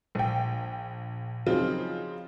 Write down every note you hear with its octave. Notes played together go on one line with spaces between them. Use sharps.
A#1 G5
C#3 F3 F#3 C4 D#4 F4